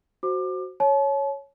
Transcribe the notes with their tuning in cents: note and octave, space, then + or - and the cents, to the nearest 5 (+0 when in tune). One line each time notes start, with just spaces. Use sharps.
F#4 +0 C5 +0 D6 +25
C#5 +0 A5 -40